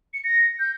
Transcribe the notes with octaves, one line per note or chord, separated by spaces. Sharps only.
C#7
A#6
G6